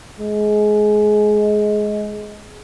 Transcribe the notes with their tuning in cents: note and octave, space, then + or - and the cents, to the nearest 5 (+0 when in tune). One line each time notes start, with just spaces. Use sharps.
G#3 +20